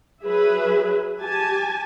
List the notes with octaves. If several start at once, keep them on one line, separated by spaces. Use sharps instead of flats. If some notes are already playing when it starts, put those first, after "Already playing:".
F#3 G#4 B4 E5
G4 G#5 A5